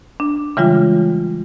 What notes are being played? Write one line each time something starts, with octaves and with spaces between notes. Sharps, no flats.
D4
C#3 E3 G3 G#3 F4